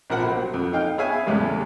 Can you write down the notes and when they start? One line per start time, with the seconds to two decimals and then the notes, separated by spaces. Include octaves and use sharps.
0.10 A#1 F3 A#4 F#5 B5
0.24 F#3 A#3 C4
0.54 F2
0.73 D#4 F5 G5 F6
0.98 B3 G#4 C#5 E5 F5 G#5
1.26 E2 A2 C#3 G3 G#3 A#3